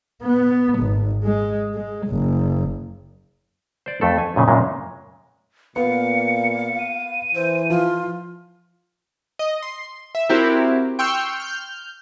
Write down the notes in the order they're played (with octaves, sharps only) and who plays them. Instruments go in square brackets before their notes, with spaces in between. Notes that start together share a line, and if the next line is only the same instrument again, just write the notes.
[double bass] B3
G#1
G#3
G#3
F#1
[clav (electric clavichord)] C5 D5
F2 A3 A4
G#5
F#2 A#2 C#3
F#2 A#2 C#3 G#3
[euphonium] A#2 [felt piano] B3 [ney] F5 [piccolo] C#7
[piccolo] D#7
[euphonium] E3 [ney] C5
[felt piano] F3 [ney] F4
[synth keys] D#5
C6
E5
C4 E4 F#4 G4 A#4
G5 C6 C#6 E6 F6 G6
F6 G6